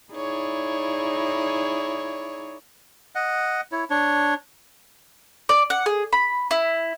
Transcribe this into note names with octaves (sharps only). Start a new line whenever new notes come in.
D#4 E4 G#4 C#5 D5
D#5 F#5
E4 C#5
D4 C#5
D5
F#5
G#4
B5
E4